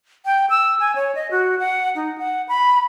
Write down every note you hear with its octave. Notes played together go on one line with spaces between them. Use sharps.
G5
E6
G#5
C#5
D#5
F#4
F#5
D#4
F#5
B5